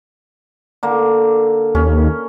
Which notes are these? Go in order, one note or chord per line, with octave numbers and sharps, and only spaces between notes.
D3 A#3
D#2 C#4